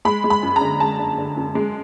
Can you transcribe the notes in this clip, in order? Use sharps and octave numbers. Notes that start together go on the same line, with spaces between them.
G#3 B5
G#3
B5
F#2
A#5
D3
G#3 A5
D3
D3
F#2
G#3